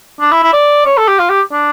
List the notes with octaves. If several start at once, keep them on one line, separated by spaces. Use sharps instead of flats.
D4
E4
E4
D5
C#5
A4
G4
F4
G4
D4